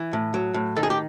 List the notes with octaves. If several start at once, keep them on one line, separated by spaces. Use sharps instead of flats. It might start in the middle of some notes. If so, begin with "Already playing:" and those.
Already playing: E3
A2
F#3
A2
D#3 A4
G#4
G4